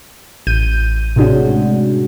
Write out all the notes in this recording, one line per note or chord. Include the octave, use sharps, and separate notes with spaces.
A1 G6 D#7
A2 C3 G#3 C#4 D4 F#4